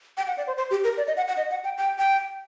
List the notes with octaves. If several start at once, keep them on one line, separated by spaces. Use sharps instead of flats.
G5
F#5
D5
C5
C5
G4
A#4
D5
D#5
F#5
F#5
D#5
F#5
G5
G5
G5